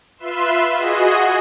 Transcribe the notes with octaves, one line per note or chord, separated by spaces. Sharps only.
F4 B4 E5 C6 E7
F#4 G#4 D#5